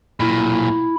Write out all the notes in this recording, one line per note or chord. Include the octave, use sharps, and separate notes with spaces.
B1 A#2 E4